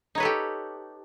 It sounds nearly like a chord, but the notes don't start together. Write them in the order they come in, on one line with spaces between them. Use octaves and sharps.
D#4 C#5 B4 A4 G4